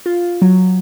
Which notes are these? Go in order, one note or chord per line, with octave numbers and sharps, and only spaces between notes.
F4
F#3